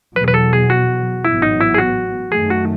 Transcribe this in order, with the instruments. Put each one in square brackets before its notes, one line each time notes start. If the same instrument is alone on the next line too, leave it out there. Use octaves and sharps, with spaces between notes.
[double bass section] E2 B2 F#3 [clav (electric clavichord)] B4
[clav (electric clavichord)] B4
A4
G#4
F#4
[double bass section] A1 G#2 F#3 B3 [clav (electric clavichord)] E4
[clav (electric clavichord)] D#4
E4
G#4
F#4
[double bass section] F#2 D#3 A3 [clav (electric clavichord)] G#4
[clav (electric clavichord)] F#4